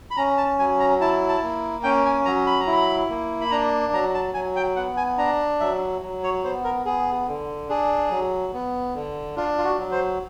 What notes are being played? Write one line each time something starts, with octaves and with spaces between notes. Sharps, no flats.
B5
C#4 A#5
A5
F#3 G#5
A#5
E4 A5
A5
A#3
C#4 G5
G#5
F#3 A#5
B5
A#5
E4
B5
A#3
B5
D4 A#5
F#3 A#5
A5
F#3 G#5
G5
B3 F#5
G#5
D4 A#5
F#3 E5
F#3
C#5
B3 C5
A#4
B3 G#4
D3
D4 G#4
F#3
B3
D3
D4 F4
F4
F#4
F#3
C5